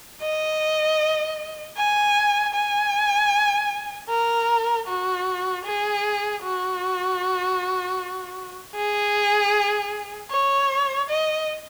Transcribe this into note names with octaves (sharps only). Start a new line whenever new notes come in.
D#5
G#5
G#5
A#4
F#4
G#4
F#4
G#4
C#5
D#5